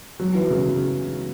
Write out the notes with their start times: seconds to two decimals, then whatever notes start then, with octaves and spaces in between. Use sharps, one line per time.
0.19 F#3
0.35 E3
0.50 C#3